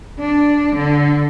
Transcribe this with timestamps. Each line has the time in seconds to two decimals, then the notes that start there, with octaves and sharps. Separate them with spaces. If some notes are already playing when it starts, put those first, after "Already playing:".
0.19 D4
0.75 D3